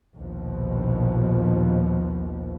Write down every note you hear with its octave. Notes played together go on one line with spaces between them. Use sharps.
A#1 D#2 B2 F3